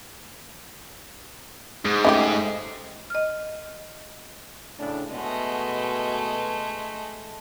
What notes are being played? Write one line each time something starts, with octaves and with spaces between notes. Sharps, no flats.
G#2 G#4 D#6
C#3 A3 E4 G4 A4 D#5
C7
D#5 F6
A2 C#3 D4
B2 G#3 A3